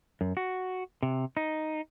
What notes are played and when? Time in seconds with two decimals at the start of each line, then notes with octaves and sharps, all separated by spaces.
0.21 F#2
0.37 F#4
1.03 C3
1.37 D#4